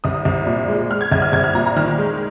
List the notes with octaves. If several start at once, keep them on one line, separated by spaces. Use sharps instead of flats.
C2 D#6
C2
A#2
G#3
G#3 F6
G#6
C2 G#6
F6
C2 G#6
F6
A#2 A#5
A#5
D#3 F6
G#3